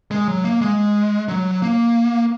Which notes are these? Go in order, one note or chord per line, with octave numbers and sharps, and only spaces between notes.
G#3
F#3
A#3
G#3
F#3
A#3